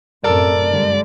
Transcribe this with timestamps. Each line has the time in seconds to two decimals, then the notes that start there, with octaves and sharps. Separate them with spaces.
0.24 F#2 A2 C3 A4 A#4 D5
0.70 G2 D3 G#3